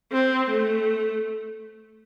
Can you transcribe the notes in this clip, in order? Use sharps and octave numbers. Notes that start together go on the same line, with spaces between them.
C4
A3